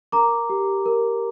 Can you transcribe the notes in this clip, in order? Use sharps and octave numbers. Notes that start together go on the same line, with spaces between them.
A#4 A#5 D6
G4
A#4